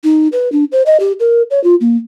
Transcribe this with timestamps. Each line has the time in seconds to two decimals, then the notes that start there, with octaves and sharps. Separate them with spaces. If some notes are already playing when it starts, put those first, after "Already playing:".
0.04 D#4
0.33 B4
0.52 D4
0.72 C5
0.86 D#5
1.00 G4
1.20 A#4
1.51 C#5
1.64 F4
1.81 A#3